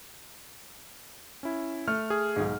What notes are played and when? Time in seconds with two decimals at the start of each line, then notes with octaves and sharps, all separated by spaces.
1.43 C#4 E4
1.88 A3 F6
2.10 G#4
2.36 B1 G#2